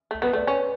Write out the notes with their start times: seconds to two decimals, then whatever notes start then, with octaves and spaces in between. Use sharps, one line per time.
0.11 A3
0.22 B3 B4
0.33 A3 D5
0.47 C#4 C#5